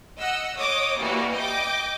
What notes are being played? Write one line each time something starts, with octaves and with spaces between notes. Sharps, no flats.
D#5 F#5 E6
C#5 D#5 D6 D#6
E3 G3 A#3 F#4
D#5 G5 D6